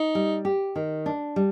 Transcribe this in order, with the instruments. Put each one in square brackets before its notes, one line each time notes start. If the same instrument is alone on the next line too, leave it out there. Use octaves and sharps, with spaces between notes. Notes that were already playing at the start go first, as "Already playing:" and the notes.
Already playing: [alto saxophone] D#4
[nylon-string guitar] G3
G4
D#3
D4
G3